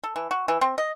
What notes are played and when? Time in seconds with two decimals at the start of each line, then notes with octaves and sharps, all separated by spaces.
0.04 A4
0.16 E3
0.31 F#4
0.48 E3
0.61 C4
0.78 D#5